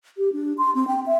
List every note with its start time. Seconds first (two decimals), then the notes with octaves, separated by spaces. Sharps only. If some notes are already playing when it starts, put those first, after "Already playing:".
0.18 G4
0.33 D4
0.58 C6
0.75 C4
0.87 G5
1.06 E5